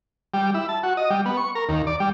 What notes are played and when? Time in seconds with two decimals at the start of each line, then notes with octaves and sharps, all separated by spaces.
0.34 G3
0.54 E4
0.69 A5
0.83 F#4
0.97 D#5
1.10 G3
1.26 B3
1.37 C#6
1.55 A#4
1.69 D#2
1.87 D5
2.00 G3